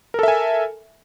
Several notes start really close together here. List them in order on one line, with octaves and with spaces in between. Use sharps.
A#4 A4 E5 G#5